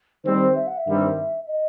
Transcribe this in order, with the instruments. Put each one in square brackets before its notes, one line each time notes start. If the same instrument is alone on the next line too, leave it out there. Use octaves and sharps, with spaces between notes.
[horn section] D#3 G3 C4 [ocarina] C5
[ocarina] E5
F#5
E5
[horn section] G2 D#3 G3 C4
[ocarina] D#5